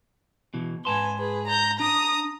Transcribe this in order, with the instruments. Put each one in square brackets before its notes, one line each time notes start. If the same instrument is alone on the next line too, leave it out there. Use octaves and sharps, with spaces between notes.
[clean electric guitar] B2 E3
[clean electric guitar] G#2 A5 C6 [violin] B4 G#5
[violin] G#4 B4
A#5 G6
[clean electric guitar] D4 [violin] A#5 D#6